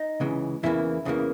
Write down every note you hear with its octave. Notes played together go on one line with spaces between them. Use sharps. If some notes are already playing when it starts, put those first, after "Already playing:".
Already playing: D#4
C#2 C#3 E3
E2 C#3 E3 A#3 E4
E2 C#3 E3 A#3